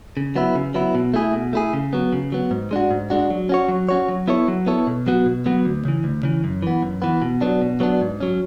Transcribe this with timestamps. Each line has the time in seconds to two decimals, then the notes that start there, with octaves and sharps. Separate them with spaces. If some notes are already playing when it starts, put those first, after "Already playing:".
0.17 C#3
0.36 F#3 B3 E4
0.55 C#3
0.74 F#3 B3 E4
0.95 B2
1.14 A3 E4 G#4
1.33 B2
1.53 A3 E4 G#4
1.73 C#3
1.93 F#3 B3
2.13 C#3
2.32 F#3 B3
2.51 G#2
2.71 G#3 D4 F#4
2.91 G#2
3.10 G#3 D4 F#4
3.30 F#3
3.49 C#4 F#4 C#5
3.68 F#3
3.89 C#4 F#4 C#5
4.08 F#3
4.28 B3 E4 A4 C#5
4.48 F#3
4.66 B3 E4 A4 C#5
4.87 B2
5.07 F#3 B3 F#4
5.26 B2
5.46 F#3 B3 F#4
5.65 D2
5.85 C#3 E3
6.04 D2
6.23 C#3 E3
6.44 F#2
6.63 E3 B3
6.82 F#2
7.02 E3 B3
7.22 B2
7.41 F#3 B3 D4
7.61 B2
7.80 F#3 B3 D4
8.01 G#2
8.20 F#3 C#4